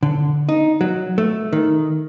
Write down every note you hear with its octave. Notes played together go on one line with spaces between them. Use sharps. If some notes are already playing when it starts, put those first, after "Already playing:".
D3
D#4
F#3
A3
D#3